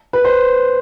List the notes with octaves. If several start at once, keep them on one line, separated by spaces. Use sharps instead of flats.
B4
C5